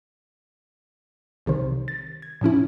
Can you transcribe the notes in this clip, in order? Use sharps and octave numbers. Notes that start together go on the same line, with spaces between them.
C2 C3 D#3 C5
A6
G#6
A2 F3 C#4 E4